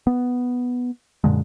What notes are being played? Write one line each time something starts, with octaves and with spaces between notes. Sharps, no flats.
B3
F#2 A#2 D3 G#3